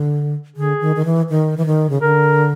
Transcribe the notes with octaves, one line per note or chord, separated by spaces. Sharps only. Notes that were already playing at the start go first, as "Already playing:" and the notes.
Already playing: D3
D3 G#4
D#3
D#3
E3
D#3
E3
D#3
C#3
D3 A#4